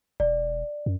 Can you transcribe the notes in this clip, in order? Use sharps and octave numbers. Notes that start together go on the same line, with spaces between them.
E1 D5
F#2